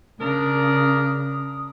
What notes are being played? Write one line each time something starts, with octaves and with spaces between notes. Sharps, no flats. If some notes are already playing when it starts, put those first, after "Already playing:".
C#3 D4 A#4 D#6